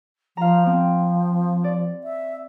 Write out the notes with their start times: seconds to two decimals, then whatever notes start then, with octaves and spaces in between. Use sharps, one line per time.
0.37 F3 F5 A#5
0.66 F3 C4
1.64 D5
2.04 E5